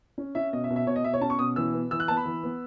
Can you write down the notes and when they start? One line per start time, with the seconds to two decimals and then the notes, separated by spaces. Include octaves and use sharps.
0.18 C#4
0.35 C#4 E5
0.52 B2 D#5
0.64 E5
0.70 B2
0.76 E5
0.87 B2 C#5
0.96 D#5
1.04 B2 E5
1.14 C#5
1.21 C#4 A5
1.30 C#6
1.39 B2 D#6
1.56 E3 E6
1.74 B3
1.91 E3 E6
2.00 F#6
2.08 B3 A5
2.17 B5
2.25 E3
2.43 B3